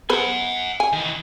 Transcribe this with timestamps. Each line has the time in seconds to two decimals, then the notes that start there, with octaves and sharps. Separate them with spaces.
0.10 B3 B4 C5 F#5 G#5
0.80 G#5
0.93 D#3 E3